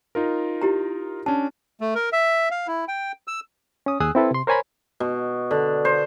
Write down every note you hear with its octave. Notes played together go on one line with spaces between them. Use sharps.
D#4 F4 A#4
E4 G4 A#5
C#4 D4 A5
A3
A#4
E5
F5
E4
G5
E6
C#4 D#6
D#2 G#4 G#5 D#6 E6 F#6
C4 E4 A4 B4
C3 C6
A#4 C5 C#5 G#5 A#5 B5
B2
D3
C5